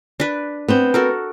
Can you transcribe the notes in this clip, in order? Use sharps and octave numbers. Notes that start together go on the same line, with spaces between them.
D4 B4
B3 C4 C5
F#4 A4 A#4